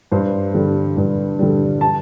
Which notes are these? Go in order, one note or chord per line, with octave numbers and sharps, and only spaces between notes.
G2 C5
D3 G3
G2
D3 G3
A5